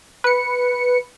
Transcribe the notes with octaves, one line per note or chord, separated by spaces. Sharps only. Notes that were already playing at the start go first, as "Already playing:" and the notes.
B4 C#7